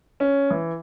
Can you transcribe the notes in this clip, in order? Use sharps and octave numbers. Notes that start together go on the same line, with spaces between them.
C#4
E3